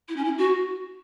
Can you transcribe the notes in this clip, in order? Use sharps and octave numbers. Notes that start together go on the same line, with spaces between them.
E4
C#4
E4
F#4